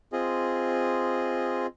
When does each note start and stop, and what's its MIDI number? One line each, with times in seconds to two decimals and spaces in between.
0.13 1.67 60
0.13 1.67 65
0.13 1.67 68
0.13 1.67 75